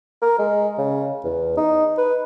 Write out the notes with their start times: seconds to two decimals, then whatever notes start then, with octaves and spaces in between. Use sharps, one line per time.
0.22 A#4
0.39 G#3
0.78 C#3
1.24 E2
1.57 D#4
1.98 B4